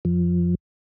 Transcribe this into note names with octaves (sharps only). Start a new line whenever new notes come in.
F2 F3